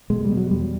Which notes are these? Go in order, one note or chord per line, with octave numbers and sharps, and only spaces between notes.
B2 G#3
G3
B2
F#3
E2 G3